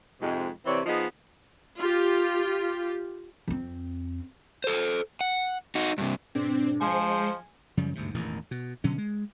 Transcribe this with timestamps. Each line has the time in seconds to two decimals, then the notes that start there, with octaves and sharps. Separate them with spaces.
0.21 F2 G#2 C3 G#3
0.66 C3 E3 C4 C#5 D5
0.86 F3 B3 D#4 G#4 D#5
1.78 F4 G4
3.48 F2 C4
4.64 A4 C5
5.21 F#5
5.75 D#4 F#4
5.98 G2 C3
6.35 G#2 B2 C4 D4
6.81 F3 G#3 C5 G#5 C#7
7.77 F#2 C#3 F3 G3
7.95 G1 D2 G#2 C3
8.14 E1 A1 E2 D#3
8.51 B2
8.84 B2 D3 F#3 C#4
8.98 G#3